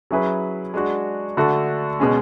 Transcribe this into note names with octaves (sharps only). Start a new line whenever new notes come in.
F#3 C#4 E4 G#4 B4
G#3 D4 F#4
D3 A3 D4 F#4 A4
B2 G#3 C#4